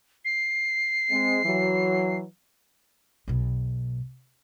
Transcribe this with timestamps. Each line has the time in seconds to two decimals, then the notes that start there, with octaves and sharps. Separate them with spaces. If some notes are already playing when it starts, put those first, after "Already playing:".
0.25 C7
1.11 G#3 C4
1.44 E3 F#3
3.28 B1 B2